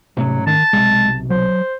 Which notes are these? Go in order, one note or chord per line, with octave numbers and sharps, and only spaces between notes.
G#2 C3 F#3 A3 C#4
D#3 A5
B1 C3 G#3
F#3 C5